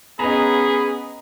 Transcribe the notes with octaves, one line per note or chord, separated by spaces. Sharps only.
B3 C#4 G#4 D#5 A#5 B5